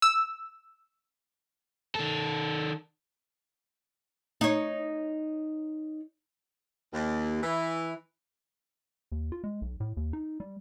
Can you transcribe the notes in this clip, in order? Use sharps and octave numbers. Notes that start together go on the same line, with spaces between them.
E6
D#3 A4
D#4 C#5
D#2
E3
D#2
F4
G#3
B1
A2
D#2
D#4
G3